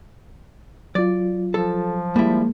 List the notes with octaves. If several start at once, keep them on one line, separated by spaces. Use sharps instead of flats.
F#3 F4 D5
F3 A4
G3 G#3 A#3 E4